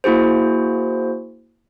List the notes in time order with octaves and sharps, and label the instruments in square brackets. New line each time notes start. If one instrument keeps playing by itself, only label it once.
[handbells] A#3 E4 F#4 G#4 C5